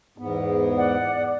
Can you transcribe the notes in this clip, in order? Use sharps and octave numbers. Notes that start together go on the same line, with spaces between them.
E2 G#2 B3
D5 F#5